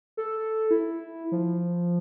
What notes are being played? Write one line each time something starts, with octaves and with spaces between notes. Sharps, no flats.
A4
E4
F3